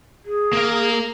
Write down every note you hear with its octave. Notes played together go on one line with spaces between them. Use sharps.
G#4
A#3 F5